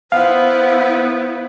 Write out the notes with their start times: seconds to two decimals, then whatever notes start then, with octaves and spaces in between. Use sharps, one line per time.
0.12 B3 E4 C5 F5